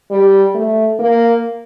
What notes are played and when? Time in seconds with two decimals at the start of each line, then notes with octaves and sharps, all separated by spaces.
0.11 G3
0.54 A3
0.99 A#3